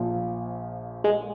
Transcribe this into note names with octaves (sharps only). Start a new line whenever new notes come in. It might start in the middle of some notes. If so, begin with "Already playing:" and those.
Already playing: A#1 A#2 F3
G#3